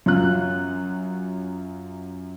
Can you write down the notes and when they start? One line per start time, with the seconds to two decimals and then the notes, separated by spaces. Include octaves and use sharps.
0.06 F#2 F#3 F4 F#6